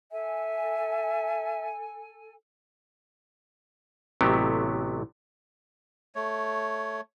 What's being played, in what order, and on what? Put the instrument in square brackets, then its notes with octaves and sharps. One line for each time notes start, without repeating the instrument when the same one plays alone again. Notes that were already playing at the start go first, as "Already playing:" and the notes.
[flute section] A4 G#5 [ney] E5
[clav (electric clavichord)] A1 C3 F#3 A3 B3 G4
[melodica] A3 C#5